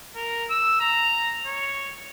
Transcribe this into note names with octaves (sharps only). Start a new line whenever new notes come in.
A#4
E6
A#5
C#5